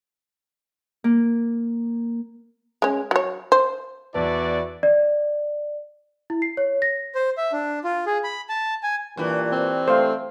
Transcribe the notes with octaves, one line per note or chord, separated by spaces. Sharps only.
A#3
G#3 C#4
F#3 C#5
C5
E2 E4 F#4 B4 D5 A5
D5
E4
C7
C#5
A#6
C5
E5
D4
F4
G#4
B5
A5
G#5
G2 A#2 E3
C4
A3 C5 F5